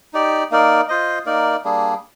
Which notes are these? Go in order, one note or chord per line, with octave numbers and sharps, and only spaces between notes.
D#4 G4 D5
A#3 D#4 A#4 D5
F4 C5 D#5
A#3 D#4 A#4 D5
G3 A#3 D4 G#4